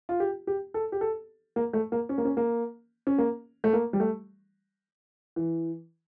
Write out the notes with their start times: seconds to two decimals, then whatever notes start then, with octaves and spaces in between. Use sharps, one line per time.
0.09 F4
0.20 G4
0.47 G4
0.74 A4
0.92 G4
1.01 A4
1.56 A#3
1.73 A3
1.92 A#3
2.09 C#4
2.18 A#3
2.25 C#4
2.37 A#3
3.07 C#4
3.18 A#3
3.64 A3
3.73 A#3
3.93 G3
4.00 A3
5.36 E3